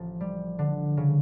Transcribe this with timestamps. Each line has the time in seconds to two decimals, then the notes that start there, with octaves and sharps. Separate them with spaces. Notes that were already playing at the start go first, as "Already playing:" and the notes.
Already playing: A1 F3
0.21 G3
0.59 D3
0.97 C#3